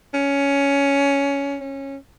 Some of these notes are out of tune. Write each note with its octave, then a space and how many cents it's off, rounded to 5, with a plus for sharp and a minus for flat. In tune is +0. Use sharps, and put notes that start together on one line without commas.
C#4 +15
C#4 -15